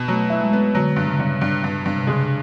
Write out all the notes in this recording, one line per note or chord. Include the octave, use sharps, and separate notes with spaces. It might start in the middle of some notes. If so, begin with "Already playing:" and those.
Already playing: B2 B3
F#3 A3
E4
G#3
B3
D3 F#3
G2
C#3
G2
G2
G2
G2
C3
C#3 G#3